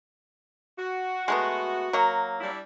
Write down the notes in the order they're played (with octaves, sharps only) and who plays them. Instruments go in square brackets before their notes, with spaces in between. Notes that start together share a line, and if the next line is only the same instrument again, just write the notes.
[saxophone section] F#4
[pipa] G#3 A3 B3
F#3 A#3
[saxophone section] G3 D4 E4